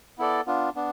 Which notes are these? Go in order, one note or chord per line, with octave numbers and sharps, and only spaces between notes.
B3 E4 A4 D5
B3 D4 F4
B3 D4